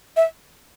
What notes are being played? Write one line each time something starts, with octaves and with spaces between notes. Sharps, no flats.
E5